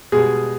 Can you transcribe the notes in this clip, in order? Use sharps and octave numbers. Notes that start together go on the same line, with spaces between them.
B2 G3 G#3 G#4